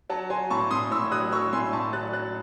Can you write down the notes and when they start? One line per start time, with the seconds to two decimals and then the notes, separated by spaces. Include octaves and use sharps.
0.10 F#3 F#5 A5
0.30 F#3 G#5 C6
0.50 A2 A5 C#6
0.71 A2 C6 D#6
0.91 A2 C#6 E6
1.12 F#3 D#6 F#6
1.32 F#3 C#6 E6
1.53 A2 G#5 C6
1.73 A2 A5 C#6
1.93 F#3 F#6 A6
2.13 F#3 F#6 A6